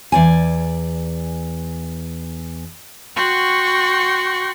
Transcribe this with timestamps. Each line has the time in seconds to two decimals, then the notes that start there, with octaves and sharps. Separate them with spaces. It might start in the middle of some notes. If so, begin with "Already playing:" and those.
0.12 E2 D5 G#5
3.16 F#4 F#5 G5 C6 C#6